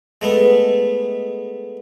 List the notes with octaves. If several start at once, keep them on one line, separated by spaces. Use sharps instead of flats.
G#3 A3 B3